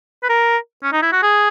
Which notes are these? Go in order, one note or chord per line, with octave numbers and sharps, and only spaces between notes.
B4
A#4
C#4
D#4
E4
F#4
G#4